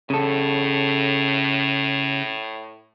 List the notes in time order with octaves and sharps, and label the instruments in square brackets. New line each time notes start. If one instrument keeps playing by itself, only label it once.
[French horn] A2 [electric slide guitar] C#3 A4